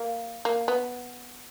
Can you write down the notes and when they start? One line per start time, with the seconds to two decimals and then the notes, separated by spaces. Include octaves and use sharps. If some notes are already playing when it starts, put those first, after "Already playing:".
Already playing: A#3
0.45 A#3
0.68 B3